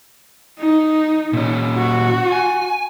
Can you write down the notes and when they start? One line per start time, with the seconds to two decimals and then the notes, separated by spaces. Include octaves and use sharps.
0.60 D#4
1.33 A#2 C#4
1.78 F#4
2.32 G#5